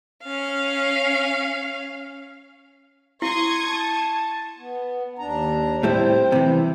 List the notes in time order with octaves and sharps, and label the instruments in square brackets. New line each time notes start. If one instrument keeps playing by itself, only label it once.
[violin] C#4 F5
[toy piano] E4 [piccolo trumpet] C6 [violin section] C#6 D#6 G#6
[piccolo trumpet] A5
[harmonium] B3
D#2 D4 A#5
[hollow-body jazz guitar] A2 G3 E4 [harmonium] C4 C5
[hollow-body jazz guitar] C3 E3